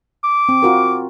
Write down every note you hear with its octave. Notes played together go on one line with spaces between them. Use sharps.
D6
C4
F4 F#4 A#4